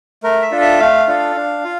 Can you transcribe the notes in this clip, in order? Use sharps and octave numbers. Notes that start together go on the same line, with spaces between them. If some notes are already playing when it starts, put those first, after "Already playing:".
A3 A#4
E5
D4 F4 A4
E5
A3 F5
D4 F4 A4
D4
F4